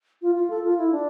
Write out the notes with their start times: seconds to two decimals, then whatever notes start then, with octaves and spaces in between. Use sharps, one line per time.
0.22 F4
0.35 F4
0.50 A4
0.64 F4
0.78 E4
0.92 D4